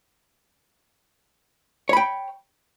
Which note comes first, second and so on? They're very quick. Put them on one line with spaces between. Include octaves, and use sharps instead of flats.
C#5 B5 G5